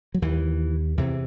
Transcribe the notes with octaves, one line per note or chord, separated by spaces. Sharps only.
F#3
D#2 E3
E2 C3 E3